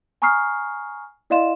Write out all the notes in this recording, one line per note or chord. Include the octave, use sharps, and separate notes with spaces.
G#5 A#5 C#6 D#6 F6 C7
E4 D5 D#5 F5 C6 E7